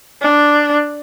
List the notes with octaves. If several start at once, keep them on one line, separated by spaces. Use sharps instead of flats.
D4